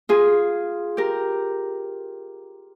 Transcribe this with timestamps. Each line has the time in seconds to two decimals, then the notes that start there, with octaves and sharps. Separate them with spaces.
0.09 F4 G#4
0.97 G4 A#4